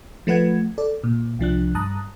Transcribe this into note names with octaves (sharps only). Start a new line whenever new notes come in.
F3 A3 B4 F#5 G#6
A4 D5
A#2
C2 F3 D4 F#6
G2 A5 A#5 D#6 F#6